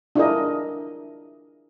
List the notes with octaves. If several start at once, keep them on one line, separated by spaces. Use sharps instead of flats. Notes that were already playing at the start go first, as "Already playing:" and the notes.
D4 E4 F4 G#4 A#4 D#5